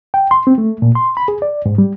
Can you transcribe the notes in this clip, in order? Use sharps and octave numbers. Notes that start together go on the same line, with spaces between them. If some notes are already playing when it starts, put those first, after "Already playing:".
G5
C6
C4
A3
A#2
C6
B5
G#4
D5
G#2
G3